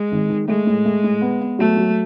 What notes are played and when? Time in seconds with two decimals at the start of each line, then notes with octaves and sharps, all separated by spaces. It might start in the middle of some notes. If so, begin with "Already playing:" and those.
Already playing: G#3
0.12 G#1
0.29 D#3
0.48 G#3 A3
0.67 A2
0.85 A3
1.04 A2
1.22 B3
1.41 B3
1.59 F#3 A3
1.77 F#3